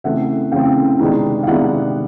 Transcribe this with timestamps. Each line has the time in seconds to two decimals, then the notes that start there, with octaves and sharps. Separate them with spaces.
0.04 C#3 E3 A3 C4 E5 F#5
0.52 C#3 E3 A3 C4 F5 G5
0.99 C3 D#3 G#3 B3 D4
1.43 F5
1.47 C3 D#3 G#3 B3 D4 E5 F#5